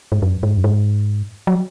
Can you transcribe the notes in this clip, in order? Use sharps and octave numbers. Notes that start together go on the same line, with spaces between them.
G#2
F#2
G#2
F#2
G#2
F#3